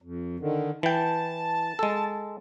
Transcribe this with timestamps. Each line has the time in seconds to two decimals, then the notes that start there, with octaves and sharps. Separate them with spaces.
0.02 F2
0.40 D3 D#3
0.83 E3 G5 A5
1.79 G#3 A4